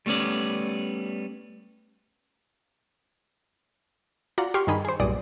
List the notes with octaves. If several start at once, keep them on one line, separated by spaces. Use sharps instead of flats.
G3 A3 B3 C#4 D5
F4 F#4 D5 F#5 A#5
G4 C6 C#6 F6
G2 D#3 G#4 B5
G#4 C5
B1 G2 A#2 G#4 D5 D#6